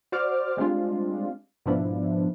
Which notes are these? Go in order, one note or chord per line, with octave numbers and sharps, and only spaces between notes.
F#4 C5 D5 D6 F6
G3 G#3 C4 D4 F4
G#2 B2 F3 D4 E4